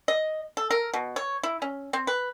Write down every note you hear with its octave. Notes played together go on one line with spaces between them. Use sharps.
D#5
A4
A#4
B2
C#5
E4
C#4
C4
B4